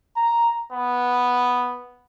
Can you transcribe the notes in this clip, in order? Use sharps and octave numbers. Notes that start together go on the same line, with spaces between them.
A#5
B3